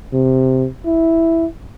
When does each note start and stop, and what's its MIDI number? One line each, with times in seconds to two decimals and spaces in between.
0.13 0.66 48
0.86 1.46 64